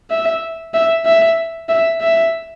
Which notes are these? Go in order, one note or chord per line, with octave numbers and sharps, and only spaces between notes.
E5
E5
E5
E5
E5